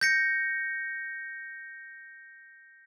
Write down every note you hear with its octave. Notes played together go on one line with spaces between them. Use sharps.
G6 A#6 C#7